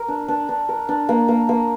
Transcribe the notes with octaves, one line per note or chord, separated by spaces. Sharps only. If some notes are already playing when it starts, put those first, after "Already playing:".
Already playing: A#4
D4
D4
D4
A#4
D4
A#3
A#3
A#3